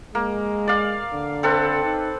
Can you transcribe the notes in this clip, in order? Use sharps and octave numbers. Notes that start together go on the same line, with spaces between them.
G#3 A#3
D5 F5
D3
C4 A4 B4
D#4